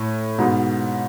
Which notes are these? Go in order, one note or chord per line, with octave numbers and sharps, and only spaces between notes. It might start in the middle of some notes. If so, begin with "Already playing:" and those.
Already playing: A2
G#2 B2